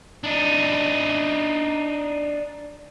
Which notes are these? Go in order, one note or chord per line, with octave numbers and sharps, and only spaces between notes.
D4 D#4